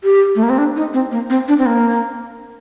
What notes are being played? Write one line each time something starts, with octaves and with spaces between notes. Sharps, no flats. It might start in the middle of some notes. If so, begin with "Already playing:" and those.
G4
A3
A#3
C4
D4
D#4
C4
A#3
C4
D4
C4
A#3